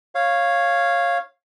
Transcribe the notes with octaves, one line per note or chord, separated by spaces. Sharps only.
C#5 F5